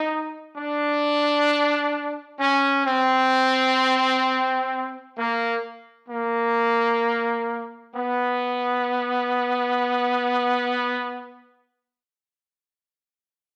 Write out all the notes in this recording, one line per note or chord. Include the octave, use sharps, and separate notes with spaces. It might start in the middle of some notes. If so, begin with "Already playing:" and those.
Already playing: D#4
D4
C#4
C4
A#3
A#3
B3